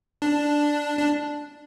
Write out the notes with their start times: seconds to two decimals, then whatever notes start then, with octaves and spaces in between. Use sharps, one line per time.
0.22 D4
0.99 D4